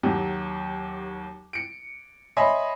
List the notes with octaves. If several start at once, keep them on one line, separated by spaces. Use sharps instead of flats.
D#2 F#3 G4
C#7 D7
C#5 D#5 E5 G#5 B5 C6